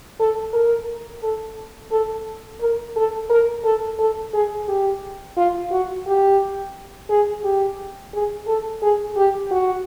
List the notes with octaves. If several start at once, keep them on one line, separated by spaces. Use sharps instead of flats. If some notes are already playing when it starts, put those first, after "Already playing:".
A4
A#4
A4
A4
A#4
A4
A#4
A4
A4
G#4
G4
F4
F#4
G4
G#4
G4
G#4
A4
G#4
G4
F#4